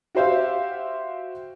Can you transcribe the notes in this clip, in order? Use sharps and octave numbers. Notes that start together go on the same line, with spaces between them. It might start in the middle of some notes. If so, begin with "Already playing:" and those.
F#4 G4 C5 E5 F5